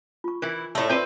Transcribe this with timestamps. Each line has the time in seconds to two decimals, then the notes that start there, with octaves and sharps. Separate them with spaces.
0.24 F4 C#6
0.42 E3 E4 A#4
0.75 A2 G#3 A3 A4 C#6
0.90 C4 F4 B4 C5 D5